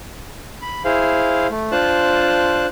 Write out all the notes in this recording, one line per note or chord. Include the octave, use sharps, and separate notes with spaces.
B5
E4 G#4 C5 F5
A3
D4 F4 C5 A5 F#6